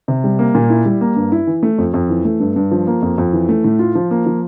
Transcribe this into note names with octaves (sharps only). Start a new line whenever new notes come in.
C3
G3
A#3
A#2
E4
G3
A#3
G2
E4
E3
A3
F2
F2
E3
A3
G2
G2
F3
A#3
F2
F2
E3
A3
A2
F4
F3
A#3
F3